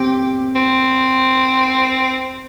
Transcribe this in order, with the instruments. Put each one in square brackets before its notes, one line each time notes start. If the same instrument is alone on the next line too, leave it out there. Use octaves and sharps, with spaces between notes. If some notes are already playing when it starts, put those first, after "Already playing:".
Already playing: [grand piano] C4 [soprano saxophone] G4
[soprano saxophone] C4